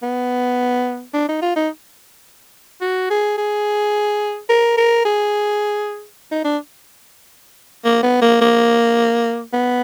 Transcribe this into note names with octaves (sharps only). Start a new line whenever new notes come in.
B3
D4
D#4
F4
D#4
F#4
G#4
G#4
A#4
A#4
G#4
D#4
D4
A#3
B3
A#3
A#3
B3